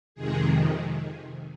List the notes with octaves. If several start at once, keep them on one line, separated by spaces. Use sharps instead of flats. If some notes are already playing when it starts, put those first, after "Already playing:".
F2 C3 D#3 G#3 G#4